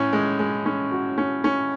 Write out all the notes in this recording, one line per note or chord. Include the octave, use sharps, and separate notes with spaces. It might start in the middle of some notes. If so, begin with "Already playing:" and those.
Already playing: A2 C#4
G#3
G#3
C#4
F#4
C#4
C#4